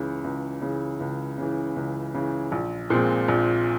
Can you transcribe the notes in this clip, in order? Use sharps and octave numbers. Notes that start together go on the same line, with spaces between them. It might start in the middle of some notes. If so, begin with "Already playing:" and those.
Already playing: C#2 C#3 E3
C#2
C#3 E3
C#2
C#3 E3
C#2
C#3 E3
A#1
A#2 F3 G#3 C4
A#1